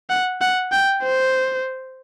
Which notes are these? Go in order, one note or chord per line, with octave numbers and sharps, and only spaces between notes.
F#5
F#5
G5
C5